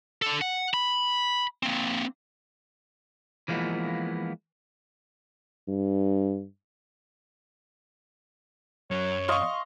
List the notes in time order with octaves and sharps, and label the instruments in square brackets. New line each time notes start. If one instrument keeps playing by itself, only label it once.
[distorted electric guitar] D3 A4
F#5
B5
A#3 C4
[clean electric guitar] E3 F3 G#3 A#3 B3
[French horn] G2
[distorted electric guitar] F#2 F#3 [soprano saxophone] C#5
[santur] D#5 F5 [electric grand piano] C6 C#6